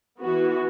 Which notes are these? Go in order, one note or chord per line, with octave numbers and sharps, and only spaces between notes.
E3 B3 F#4